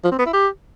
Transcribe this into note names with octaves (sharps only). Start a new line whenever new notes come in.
F3
C4
B3
E4
G4